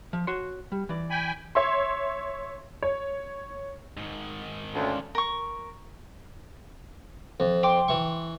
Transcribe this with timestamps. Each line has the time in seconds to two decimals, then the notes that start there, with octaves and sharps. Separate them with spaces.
0.13 F3
0.27 F#4 C#5 C6
0.72 G3
0.89 E3 D5
1.10 G5 G#5 B5
1.55 C#5 E5 C6
2.83 C#5
3.97 G#2 D#3
4.74 D2 C#4 D4 F4
5.15 A#4 C#6
7.40 F2
7.63 G5 C6 D6
7.88 E3 C#6